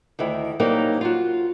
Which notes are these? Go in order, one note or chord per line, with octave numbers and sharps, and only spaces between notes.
D2 D#3 E4
F#3 G3 A#3 C4 D#4 A#4
F4 F#4